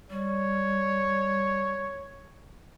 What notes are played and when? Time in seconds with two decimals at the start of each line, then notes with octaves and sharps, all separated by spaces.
0.10 G3 C#5